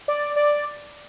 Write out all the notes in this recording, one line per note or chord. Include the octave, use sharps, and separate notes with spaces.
D5
D5